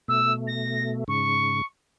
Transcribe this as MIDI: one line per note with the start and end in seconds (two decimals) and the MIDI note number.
0.08 1.04 47
0.08 1.04 57
0.08 0.32 88
0.47 0.89 94
1.08 1.62 44
1.08 1.62 49
1.08 1.64 85